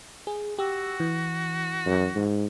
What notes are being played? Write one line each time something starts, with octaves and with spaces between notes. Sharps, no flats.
G#4
F#4 G4 E6
E3
F#2
G#2